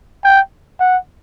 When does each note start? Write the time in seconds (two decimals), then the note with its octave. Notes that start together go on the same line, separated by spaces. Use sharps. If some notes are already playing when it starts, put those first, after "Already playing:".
0.24 G5
0.80 F#5